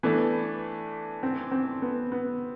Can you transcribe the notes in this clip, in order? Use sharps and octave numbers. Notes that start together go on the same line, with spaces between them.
E3 A3 B3 D4 A4
C4
C4
B3
B3